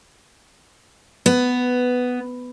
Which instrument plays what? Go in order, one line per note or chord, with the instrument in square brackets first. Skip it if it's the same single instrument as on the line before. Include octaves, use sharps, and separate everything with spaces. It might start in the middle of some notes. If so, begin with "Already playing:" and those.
[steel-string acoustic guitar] B3